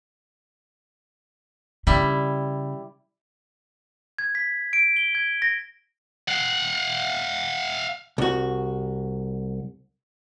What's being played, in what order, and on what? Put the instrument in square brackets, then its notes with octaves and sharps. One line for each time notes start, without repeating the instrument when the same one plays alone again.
[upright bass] C#3 [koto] G3 E4
[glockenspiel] G#6
B6
D7
G7
G#6
A#6
[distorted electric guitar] F5 F#5
[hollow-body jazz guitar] C2 F#4